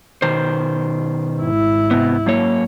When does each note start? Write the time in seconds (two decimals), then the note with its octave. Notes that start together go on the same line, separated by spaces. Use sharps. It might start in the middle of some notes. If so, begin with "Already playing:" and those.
0.22 B2 D#3 C5
1.39 G#1 E4
1.91 C3 B3
2.26 F#2 A#3 C#5